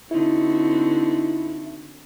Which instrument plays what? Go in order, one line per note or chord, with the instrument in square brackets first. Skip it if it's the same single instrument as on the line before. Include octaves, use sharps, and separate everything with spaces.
[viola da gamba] D3 C4 F#4 [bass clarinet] D#4 [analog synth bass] E4